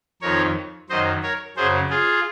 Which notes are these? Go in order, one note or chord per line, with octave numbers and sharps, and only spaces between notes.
F2 D#3 A#4 C#5
F#2 D#3 C5 D#5
A#4 C#5
F#2 C#3 G#4 C5
F4 G#4